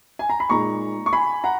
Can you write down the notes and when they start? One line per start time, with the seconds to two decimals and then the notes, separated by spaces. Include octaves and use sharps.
0.19 G#5
0.30 A#5
0.40 B5
0.50 A#2 G#3 D#4 A#5 C#6
1.06 C#6
1.13 G#5 B5
1.44 F#5 A#5